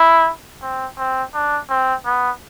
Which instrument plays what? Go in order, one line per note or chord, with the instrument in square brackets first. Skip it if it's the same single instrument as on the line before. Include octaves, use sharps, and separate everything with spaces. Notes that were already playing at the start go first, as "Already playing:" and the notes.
Already playing: [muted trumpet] E4
C4
C4
D4
C4
B3